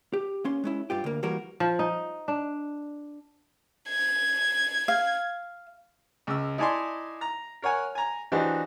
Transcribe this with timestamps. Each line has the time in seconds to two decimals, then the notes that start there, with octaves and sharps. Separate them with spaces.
0.13 G4
0.44 A#3 C#4 C6
0.64 G#3 C#4 E4
0.90 G2 F4 G4
1.04 D2 A#3
1.23 E3 G3 A#3 F#4 A#4
1.60 F3
1.79 D#4
2.28 D4
3.89 G#6
4.88 F5
6.27 C#2 E6
6.58 D#4 E4 D5 G#5 A5 C6
7.21 A#5
7.62 A#4 C#5 F#5 G#5
7.95 G#5 A#5
8.32 E3 D4 D#4 F#4 G4 C5